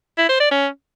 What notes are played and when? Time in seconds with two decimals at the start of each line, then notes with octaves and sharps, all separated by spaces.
0.18 E4
0.29 C5
0.40 D5
0.51 C#4